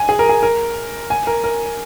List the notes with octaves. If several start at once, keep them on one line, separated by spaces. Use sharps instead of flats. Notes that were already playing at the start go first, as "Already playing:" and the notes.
Already playing: G#5
G#4
A#4
G#4
A#4
G#5
A#4
A#4